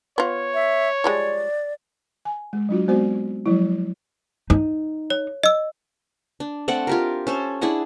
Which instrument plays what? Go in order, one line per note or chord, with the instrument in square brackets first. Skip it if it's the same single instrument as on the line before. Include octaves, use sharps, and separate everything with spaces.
[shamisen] B3 F4 [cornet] C#5
[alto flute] E5
[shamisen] F3 G3 G#3 [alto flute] D5
[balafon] G#5
G#3
F#3 D4 F4 F#4
G#3 B3 C4 F#4 C5 D5
F3 F#3 G#3 E4
[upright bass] D#4
[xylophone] C#5
D#5 E6
[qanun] D4
A3 C4 D5 F#5
F4 G4 A#4
C#4 A4 C5
D4 E4 G#4 F#5